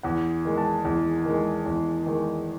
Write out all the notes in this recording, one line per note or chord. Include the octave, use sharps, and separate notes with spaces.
E2 F#5
D#3 G#3
A5
E2
D#3 G#3
E2
D#3 G#3